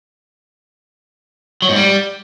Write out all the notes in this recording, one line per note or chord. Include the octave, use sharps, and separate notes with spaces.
F#3
G#2
G3